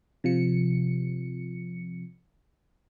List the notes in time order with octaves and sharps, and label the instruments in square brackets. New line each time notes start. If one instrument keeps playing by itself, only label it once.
[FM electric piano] C3 F3 C#7